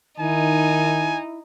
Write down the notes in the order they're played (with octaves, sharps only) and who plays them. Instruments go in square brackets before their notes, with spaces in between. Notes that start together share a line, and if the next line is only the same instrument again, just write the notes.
[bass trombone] D#3 [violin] D#4 [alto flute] E4 [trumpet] G#5